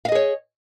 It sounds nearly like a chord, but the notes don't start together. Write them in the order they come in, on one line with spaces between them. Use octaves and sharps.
F5 D#5 G#4 C#5